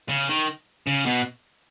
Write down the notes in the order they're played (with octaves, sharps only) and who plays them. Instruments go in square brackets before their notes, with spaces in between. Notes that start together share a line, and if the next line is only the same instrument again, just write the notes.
[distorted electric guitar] C#3
D#3
C#3
B2